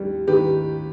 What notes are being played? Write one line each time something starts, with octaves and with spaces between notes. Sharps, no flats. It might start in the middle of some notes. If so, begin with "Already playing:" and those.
Already playing: D#2 G3
D#3 G4 B4